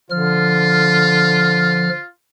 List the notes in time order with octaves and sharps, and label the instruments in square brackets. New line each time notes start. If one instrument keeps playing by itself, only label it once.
[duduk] D3 [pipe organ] F3 F6 [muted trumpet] F4